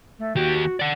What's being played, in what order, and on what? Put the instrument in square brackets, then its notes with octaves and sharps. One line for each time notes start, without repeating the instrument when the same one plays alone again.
[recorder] A3
[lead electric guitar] D#2 G4 [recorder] F#4
[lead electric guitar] D5 F#5